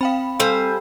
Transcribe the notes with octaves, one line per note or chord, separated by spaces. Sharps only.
C4 F5 G5 B5
G3 A4 C5 G#5